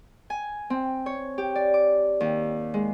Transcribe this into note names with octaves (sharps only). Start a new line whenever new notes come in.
G#5
C4
C#5
G4
D5
D6
D#2
G#3